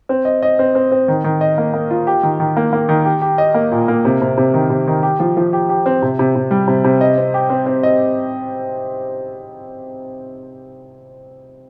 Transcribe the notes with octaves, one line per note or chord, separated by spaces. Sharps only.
C4
D#5
D#5
C4
C4
C4
D#3
D#3
D#5
A#3
A#3
F4
G4
D#3
D#3
A#3
A#3
D#3
G4
G4
D#5
A#3
A#2
A#3
C3
C3
C3
D#3
C3
D#3
G4
F3
F3
G4
G4
C4
C3
C3
C3
G3
C3
C3
D#5
C4
G4
C4
C4
D#5